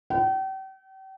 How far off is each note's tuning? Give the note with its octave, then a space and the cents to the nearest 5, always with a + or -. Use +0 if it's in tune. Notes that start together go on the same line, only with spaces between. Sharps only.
G5 -40